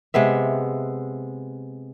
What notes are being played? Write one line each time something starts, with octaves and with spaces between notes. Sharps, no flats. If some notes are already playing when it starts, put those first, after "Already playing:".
C3 G#3 B3 E5